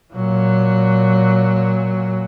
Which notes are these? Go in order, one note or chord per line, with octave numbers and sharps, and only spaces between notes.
A#2 F#3